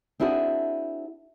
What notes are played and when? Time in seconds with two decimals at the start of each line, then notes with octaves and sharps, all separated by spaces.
0.20 C4 D4 E4 F#4 G#4